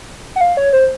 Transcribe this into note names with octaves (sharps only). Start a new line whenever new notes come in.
F#5
F5
C#5
C5